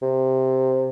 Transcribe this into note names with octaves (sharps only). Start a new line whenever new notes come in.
C3